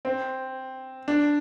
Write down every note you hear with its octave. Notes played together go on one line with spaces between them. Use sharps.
C4
D4